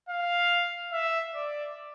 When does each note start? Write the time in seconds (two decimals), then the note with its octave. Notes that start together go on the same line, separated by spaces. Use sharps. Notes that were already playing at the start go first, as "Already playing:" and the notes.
0.09 F5
0.93 E5
1.35 D5